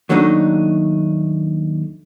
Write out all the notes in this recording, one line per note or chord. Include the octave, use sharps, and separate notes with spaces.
D#2 F#3 A3 D4 D#4